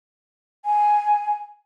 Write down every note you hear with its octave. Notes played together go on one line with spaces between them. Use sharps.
G#5